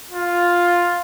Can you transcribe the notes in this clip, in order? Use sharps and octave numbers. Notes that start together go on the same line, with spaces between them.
F4